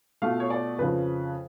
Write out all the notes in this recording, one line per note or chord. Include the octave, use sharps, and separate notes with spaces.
B2 A3 F4 F5
C#5
D5
F2 C#3 F3 B4